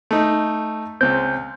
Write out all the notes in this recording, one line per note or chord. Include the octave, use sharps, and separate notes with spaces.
A3 D#4
C#2 C4 G6